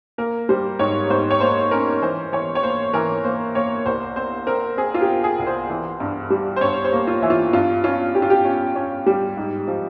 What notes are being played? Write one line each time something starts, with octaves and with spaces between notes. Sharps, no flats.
A#3 A#4
G3 C5
G#2 C#5
G#2 C5
C#5
A#3 C5
C#4 A#4
E3 C5
E3 C#5
C#5
A#3 C5
E3 A#4
A#3 C5
A#3 C#5
C2 C5
C4 C5
C4 A#4
C4 G#4
F4
G4
C4
G#4
C2
C5
E3
G2
G3
C5
G2 C#5
C5
A#3
F4
E3 E4
F4
G2 F4
C#4 F4
C#4 G4
F4
G4
C#4
C#4
G3
G#2
F3